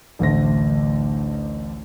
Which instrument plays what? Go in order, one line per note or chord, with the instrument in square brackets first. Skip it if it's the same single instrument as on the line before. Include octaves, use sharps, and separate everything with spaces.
[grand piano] A1 D2 D3 A3 C5 A#6